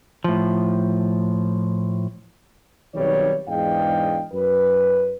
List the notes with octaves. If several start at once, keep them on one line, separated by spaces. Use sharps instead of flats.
A2 F3
B1 D#3 G3 C4 C#5
E2 G#2 D4 D#5 F5 G5
F#2 B4